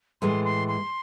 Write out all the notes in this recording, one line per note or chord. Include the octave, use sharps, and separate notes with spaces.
A2 E3 G#3 C6
C6
C6